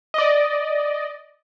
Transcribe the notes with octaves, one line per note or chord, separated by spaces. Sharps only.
D5 D#5